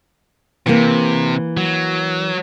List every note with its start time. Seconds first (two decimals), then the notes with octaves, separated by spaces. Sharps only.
0.66 C3 E3 A#3
1.57 F#3